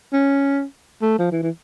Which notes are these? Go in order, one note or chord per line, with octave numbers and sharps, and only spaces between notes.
C#4
A3
F3
E3
E3